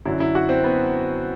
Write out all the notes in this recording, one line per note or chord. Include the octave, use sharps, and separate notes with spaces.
F#2 D3 F#3 E4
E4
F#4
C4
B3